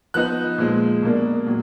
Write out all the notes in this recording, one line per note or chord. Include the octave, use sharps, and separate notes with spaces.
F3 B3 D#4 F#6
A#2 F3 G#3
B2 A#3 D4
A#2 F#3